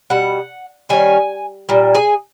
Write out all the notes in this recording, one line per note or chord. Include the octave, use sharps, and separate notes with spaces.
B2 G3 F#5
D#3 G3 C#4 G#5
A#2 G3
G#4 G#5